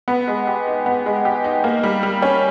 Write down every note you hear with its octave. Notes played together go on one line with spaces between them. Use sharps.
B3
G#3
G4
D#4
B3
G#3
G4
D#4
A#3
G3
G3
C#4